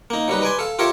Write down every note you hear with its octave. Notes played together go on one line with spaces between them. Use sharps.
A#3 D#4
F#3 G3 D#4 B4
B4 D5 G#5 C6
A4 F5
F4 G4 A#4 C#5 E5